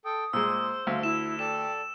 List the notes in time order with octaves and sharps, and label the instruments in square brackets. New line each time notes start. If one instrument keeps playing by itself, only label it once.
[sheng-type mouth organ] A4 G5 [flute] D#6
[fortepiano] A#2 G#3 [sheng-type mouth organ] C5 [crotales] E6
[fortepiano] D2 [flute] F5
[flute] E4 [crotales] E7
[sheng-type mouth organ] A4 D5 [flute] G5 [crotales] E7